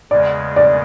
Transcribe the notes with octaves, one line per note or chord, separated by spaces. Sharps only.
E2 C#3 G#3 D5
D5